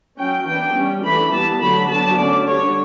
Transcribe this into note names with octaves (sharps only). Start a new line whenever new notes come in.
F#3 C#4 G5
E3 B3 D4 G5
G3 C#4
E3 A3 D4 B5
E3 G3 B3 A5
D3 F#3 A3 D4 B5
F#3 B3 D4 A5
D3 A3 C#4 D5
D3 G3 D4 C#5